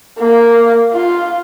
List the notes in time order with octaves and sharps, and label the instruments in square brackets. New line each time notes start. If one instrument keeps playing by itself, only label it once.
[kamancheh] A#3
F4